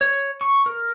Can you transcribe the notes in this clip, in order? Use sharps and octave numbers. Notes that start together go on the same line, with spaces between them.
C#5
C#6
A#4